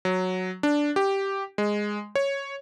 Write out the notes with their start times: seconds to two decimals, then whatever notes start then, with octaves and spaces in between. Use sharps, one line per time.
0.05 F#3
0.63 D4
0.96 G4
1.58 G#3
2.15 C#5